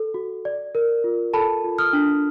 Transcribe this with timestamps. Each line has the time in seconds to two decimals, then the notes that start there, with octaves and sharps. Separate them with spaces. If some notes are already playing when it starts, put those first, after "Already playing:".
Already playing: A4
0.14 F#4
0.45 D5
0.75 A#4
1.04 F4
1.34 A4 A5 B5
1.64 F4
1.78 D#6 F6
1.93 D4